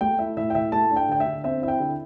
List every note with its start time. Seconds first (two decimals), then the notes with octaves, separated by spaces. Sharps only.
0.01 A3 G5
0.19 E4 E5
0.37 A2 E5
0.50 G5
0.55 A2 E5
0.72 A3 A5
0.91 D4
0.96 G5
1.08 D3 G5
1.20 E5
1.26 D3
1.44 C4 E5
1.62 E4 E5
1.68 G5
1.80 D3